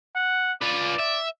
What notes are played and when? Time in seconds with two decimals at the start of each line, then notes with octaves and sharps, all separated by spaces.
0.15 F#5
0.61 F4 B4 D5
0.99 E5